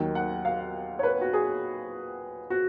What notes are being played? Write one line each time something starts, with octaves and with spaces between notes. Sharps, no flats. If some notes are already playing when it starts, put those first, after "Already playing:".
Already playing: D#2 D#3 F#3
F#5
F5
C#5
B4
F#4
G#4
F#4